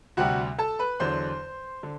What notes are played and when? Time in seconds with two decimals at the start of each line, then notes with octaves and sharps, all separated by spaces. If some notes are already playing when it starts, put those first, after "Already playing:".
0.17 D2 C3 G3 F#4 F#5
0.58 A4 A5
0.79 B4 B5
1.00 E2 D3 F#3 C5 C6
1.83 D3